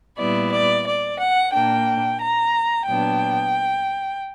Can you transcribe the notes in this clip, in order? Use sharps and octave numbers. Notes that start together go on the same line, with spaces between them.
A#2 G3 B3 E4 D5
D5
D5
F#5
A#2 A#3 D4 G5
A#5
A#2 F#3 B3 D4 G5